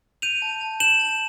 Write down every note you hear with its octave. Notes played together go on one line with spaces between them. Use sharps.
G6 D#7 F7
A5
A5
G6 E7 F#7
A5